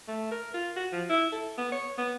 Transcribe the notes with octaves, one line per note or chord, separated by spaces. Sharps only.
A3
A#4
F4
F#4
F3
E4
A4
B3
C#5
B3